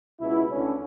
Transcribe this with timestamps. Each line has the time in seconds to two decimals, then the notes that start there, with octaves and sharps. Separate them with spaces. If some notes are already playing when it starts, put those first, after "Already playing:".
0.20 C#2 B2 E4
0.50 D2 D3 C#4